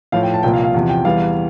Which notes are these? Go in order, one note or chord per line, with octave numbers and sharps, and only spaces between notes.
A2 F3 F5
G5
A5
C2 A#2 F3 G5
F5
F5
E2 C3 F3
G5
E2 E3 G3 F5